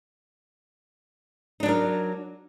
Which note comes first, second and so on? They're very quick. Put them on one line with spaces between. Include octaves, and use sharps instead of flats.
D#4 D4 F#3 A#4